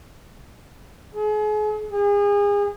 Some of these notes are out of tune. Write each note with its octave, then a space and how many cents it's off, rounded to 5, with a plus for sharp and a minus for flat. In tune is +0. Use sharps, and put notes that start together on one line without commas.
G#4 +35
G#4 -35